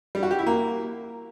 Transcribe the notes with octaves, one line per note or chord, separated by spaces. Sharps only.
G3
F#4
G4
E4
A#3